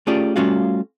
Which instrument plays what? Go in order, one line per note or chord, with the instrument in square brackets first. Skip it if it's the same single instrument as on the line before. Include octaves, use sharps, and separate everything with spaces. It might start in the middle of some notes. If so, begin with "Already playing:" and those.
[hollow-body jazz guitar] A3 C#4 F4 G4 G#4 D5
G3 A3 C#4 F4 F#4 F5